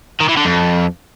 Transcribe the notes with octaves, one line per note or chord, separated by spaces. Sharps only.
D#3
E3
D3
F2